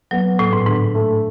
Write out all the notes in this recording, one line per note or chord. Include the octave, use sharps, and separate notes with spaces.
F#3 B3
A2 B3
G#2
G#2 D3
A3